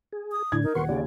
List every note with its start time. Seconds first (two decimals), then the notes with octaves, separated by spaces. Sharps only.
0.13 G#4
0.32 D#6
0.52 A2 D3 D4 E4 G#6
0.63 D#4 A#4
0.75 D#1 B4 F#5 C6 C#6
0.89 D#2 C#3 D5